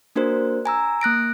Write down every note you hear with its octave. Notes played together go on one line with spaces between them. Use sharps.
A#3 D4 F#4 A#4 C5
G#5 A#5 E6
A#3 F#6 A#6 D7